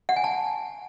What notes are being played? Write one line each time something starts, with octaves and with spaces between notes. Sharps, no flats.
F#5
G#5
A5